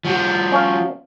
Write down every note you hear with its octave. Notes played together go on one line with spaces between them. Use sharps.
F3 F#4
C#4 C#5 F5